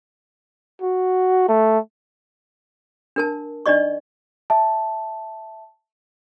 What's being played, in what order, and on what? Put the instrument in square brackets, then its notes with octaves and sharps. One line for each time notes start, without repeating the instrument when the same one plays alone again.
[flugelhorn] F#4
A3
[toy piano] D4 A#4 A5
D4 D#4 D5 D#5 C#6
[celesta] E5 A5